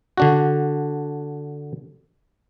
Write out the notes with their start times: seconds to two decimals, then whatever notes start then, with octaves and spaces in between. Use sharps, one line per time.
0.18 D3 D4 F#4